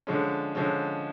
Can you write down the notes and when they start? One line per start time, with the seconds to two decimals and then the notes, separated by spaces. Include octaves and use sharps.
0.07 D3 F3 G#3 C#4
0.55 D3 F3 G#3 C#4